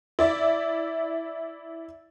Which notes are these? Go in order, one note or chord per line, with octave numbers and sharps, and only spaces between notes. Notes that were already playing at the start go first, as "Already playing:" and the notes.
E4 D5 E5